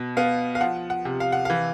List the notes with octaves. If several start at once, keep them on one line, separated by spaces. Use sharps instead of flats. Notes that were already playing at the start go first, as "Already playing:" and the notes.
Already playing: B2
B3 F5
F5
F3 F#5
F#5
C3
F5
F#5
E3 F5